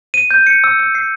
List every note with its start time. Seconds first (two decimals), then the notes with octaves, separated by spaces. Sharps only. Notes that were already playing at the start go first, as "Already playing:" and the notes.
0.14 D#7
0.31 G6
0.47 C#7
0.64 E6
0.79 E6
0.95 C7